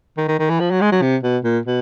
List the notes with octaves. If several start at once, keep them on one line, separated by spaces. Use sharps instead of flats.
D#3
D#3
D#3
E3
F3
F#3
G#3
F#3
C3
B2
A#2
B2